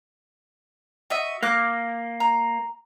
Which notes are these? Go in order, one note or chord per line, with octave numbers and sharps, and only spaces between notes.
F#4 D#5 E5
A#3 D6 F6 F#6
A#5